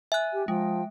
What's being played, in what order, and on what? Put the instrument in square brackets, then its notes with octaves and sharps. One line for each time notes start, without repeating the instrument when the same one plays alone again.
[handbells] E5 F#6 [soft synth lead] G#5
[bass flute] G4
[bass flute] F3 [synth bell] G#3 [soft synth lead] G5